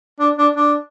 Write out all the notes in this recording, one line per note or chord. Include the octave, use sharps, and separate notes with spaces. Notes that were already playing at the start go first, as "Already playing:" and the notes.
D4
D4
D4